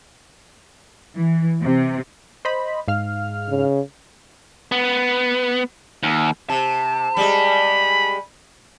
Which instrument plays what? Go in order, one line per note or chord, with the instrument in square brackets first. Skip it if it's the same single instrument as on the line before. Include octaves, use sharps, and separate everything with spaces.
[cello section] E3
C3
[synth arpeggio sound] C5 D#5 B5
G#2 F5 F6
[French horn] C#3
[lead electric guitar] B3
D#2
[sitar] C3 [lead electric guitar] A5
[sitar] G3 G#3 [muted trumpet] B5